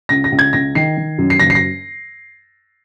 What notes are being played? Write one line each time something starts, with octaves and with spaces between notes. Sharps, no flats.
C#2 A#6
A#6
C#2
G#6
C#2 A#6
D#3 C7
D#3
F#2
C7
F#1 A#6
C7
A#6